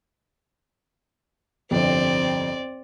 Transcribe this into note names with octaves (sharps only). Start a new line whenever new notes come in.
G1 C2 F2 C4 D5